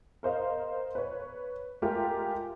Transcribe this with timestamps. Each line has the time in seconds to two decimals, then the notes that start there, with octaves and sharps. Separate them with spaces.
0.23 A#4 C5 D#5 F5
0.95 B4 C#5
1.82 G#3 A3 F4 G4 A#4